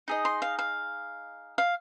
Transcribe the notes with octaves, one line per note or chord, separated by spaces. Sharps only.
D#4 G#4 D#5
C6
F5
F5
F5